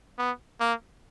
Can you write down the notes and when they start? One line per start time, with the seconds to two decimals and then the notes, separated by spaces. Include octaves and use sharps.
0.18 B3
0.60 A#3